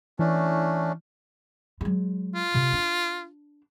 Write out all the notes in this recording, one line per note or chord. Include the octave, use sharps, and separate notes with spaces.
E3 A3 C#4 D4
F#3 G#3
F4
C3
D4